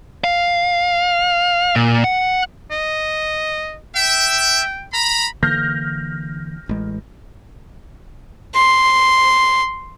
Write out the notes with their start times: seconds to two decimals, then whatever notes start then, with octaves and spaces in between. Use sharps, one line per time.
0.24 F5
1.76 A#2
2.04 F#5
2.71 D#5
3.95 E5 G5
4.93 A#5 B5
5.43 D3 E3 A#3 F6 G6 A#6
6.69 A1 G#3
8.55 C6